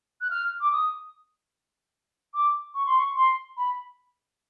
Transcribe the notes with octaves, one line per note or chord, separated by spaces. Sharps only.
F#6
F6
D6
D#6
D6
C#6
C6
C#6
C6
B5